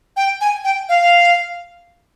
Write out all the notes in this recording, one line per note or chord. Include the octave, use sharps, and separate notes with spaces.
G5
G#5
G5
F5